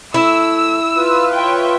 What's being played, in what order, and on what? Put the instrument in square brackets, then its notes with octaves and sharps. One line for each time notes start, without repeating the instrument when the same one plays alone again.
[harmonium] A3 [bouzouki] E4 [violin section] E6
[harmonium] F4 B4
[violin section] C#5 E5 G5